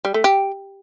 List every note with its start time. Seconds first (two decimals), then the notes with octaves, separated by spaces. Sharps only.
0.05 G3
0.14 A3
0.24 G4